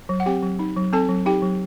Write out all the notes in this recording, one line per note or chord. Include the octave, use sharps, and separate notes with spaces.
F#3
F#5
C4 G4 G5
F#3
D#4
F#3
C4 A4 A5
F#3
D#4 G4 G5
F#3